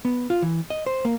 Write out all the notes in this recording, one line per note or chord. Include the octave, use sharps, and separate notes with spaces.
B3
F4
E3
D#5
C5
A#3